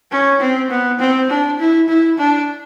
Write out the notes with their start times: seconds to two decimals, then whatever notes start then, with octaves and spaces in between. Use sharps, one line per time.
0.11 C#4
0.41 C4
0.70 B3
1.00 C4
1.30 D4
1.59 E4
1.89 E4
2.18 D4